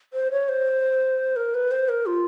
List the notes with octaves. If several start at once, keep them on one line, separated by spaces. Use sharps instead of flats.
C5
C#5
C5
A#4
B4
C5
A#4
F4